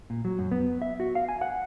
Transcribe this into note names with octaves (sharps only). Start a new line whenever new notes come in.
A#2
F#3
F#2
B3
E5
F#4
F5
G#5
F#5